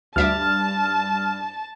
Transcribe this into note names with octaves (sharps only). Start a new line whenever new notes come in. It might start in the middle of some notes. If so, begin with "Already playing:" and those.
D2 G2 E5 A5 D6 F6